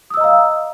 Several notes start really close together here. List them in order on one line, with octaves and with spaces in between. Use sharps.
D#6 E6 D#5 A#5 F5